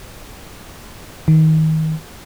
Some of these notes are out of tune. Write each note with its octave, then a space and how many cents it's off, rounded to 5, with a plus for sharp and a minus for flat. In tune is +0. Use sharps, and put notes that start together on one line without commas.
D#3 +25